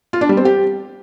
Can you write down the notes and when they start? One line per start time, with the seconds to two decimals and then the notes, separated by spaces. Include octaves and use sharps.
0.13 F4
0.21 D4
0.29 G3
0.37 C4
0.45 G4